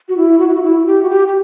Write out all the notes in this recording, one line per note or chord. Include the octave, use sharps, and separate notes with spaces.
F#4
E4
F#4
E4
F#4
E4
G4
F#4
G4
G4